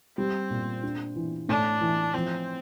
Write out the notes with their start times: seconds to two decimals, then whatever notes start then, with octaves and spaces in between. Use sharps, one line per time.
0.17 G3 C4
0.50 A#2
0.83 D4
1.16 E3
1.49 A2 D4
1.81 E3
2.14 F3 C4